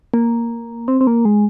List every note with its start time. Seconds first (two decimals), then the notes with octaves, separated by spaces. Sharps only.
0.14 A#3
0.88 C4
1.01 C4
1.07 A#3
1.25 G#3